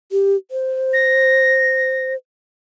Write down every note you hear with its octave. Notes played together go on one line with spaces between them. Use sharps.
G4
C5
A#6